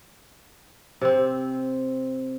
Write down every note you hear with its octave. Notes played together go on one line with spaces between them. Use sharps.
C3 C4